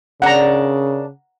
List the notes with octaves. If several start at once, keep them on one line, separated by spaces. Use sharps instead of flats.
C#3 D4 A#4 F#5 A#5